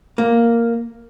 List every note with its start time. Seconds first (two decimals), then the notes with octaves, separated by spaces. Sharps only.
0.18 A#3